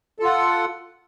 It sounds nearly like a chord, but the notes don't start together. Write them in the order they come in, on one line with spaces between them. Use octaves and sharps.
A4 F4 F#5